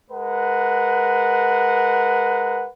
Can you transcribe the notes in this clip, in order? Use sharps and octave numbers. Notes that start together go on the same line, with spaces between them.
G#3 A#4 B4 F#5